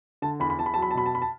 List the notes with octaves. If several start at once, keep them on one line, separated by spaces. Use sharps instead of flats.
D3 A5
E2 B5
B5
E2 A5
B5
F#3 A5
B5
A5
B2 B5
A5
B5
A5